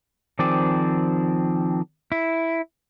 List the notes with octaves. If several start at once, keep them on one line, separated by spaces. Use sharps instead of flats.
D#3 F3 C4 G#4 D5
E4